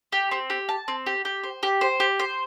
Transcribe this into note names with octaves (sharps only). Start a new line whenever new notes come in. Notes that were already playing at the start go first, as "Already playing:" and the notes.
G4
C4
G4
A5
C4
G4
G4
C5
G4
C5
G4
C5